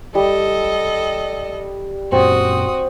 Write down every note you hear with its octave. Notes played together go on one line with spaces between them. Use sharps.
G3 A4 D#5
F#2 A#2 C4 F#4 D#6